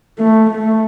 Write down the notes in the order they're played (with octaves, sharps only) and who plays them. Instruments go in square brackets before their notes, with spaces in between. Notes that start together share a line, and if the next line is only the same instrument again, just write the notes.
[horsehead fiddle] A3
A3